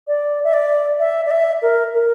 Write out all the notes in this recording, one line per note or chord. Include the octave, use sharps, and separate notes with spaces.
D5
E5
D5
E5
D5
E5
A#4
A#4